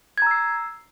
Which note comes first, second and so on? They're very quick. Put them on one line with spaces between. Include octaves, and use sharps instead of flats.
G#6 A#5 E6 C7